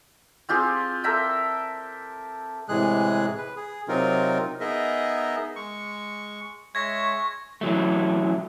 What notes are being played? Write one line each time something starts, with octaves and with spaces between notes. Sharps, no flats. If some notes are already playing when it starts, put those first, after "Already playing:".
C4 F4 G4 G#4
A4 A#4 E5 G5
A2 C3 E3 G#3 G#4 F#6
B4
G#4
C3 F#3 C4 D#4 F4 A#4
B3 D#4 G#4 A#4 D#5 E5
G#3 C#6
G#3 C#5 E5 C#6 G#6 A#6
E3 F#3 A3